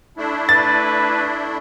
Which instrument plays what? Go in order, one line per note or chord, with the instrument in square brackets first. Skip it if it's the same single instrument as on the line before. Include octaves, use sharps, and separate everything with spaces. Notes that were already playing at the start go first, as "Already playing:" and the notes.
[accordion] A3 D4 E4
[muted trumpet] B4 [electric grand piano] A6